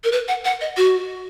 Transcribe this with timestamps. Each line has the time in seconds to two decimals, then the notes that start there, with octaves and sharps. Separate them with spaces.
0.04 A#4
0.12 B4
0.28 F#5
0.45 F#5
0.61 D#5
0.77 F#4